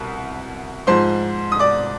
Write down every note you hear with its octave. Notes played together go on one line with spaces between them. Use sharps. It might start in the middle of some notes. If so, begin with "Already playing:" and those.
Already playing: C2 B2
G#2 F3 C5 C6
D#6
D5 D6